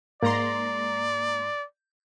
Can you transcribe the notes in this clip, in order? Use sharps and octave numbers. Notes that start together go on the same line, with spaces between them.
G#2 A#3 D5 A#5 C6